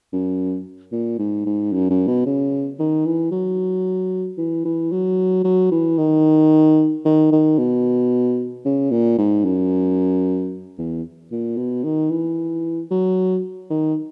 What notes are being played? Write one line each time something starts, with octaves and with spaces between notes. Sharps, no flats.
F#2
A#2
G#2
G#2
F#2
F#2
B2
C#3
D#3
E3
F#3
E3
E3
F#3
F#3
E3
D#3
D#3
D#3
B2
C#3
A#2
G#2
F#2
E2
A#2
B2
D#3
E3
F#3
D#3